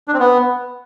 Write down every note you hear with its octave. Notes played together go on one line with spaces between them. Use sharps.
D4
C4
B3